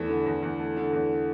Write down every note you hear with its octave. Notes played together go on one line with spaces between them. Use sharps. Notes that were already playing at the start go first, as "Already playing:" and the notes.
Already playing: E2 A3
D3
E2
E2
A3
D3
E2